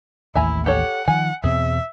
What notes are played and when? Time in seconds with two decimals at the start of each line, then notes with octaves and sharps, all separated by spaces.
0.35 A1 D#2 A3 E4 E5 G#5 A#5
0.66 G4 A4 C#5 F#5
1.08 D#3 F3 F#5 G#5
1.44 E2 B2 C4 G#4 E5